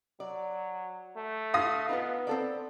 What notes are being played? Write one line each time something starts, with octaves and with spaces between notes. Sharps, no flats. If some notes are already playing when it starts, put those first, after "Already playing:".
F#3 D5
A3
F5 D#6 A#6
B3 D#4 F4 B4
C4 A4 D5